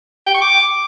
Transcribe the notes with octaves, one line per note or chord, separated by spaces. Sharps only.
G5
C#6
D6